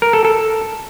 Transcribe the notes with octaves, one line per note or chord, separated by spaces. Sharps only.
A#4
A4
A4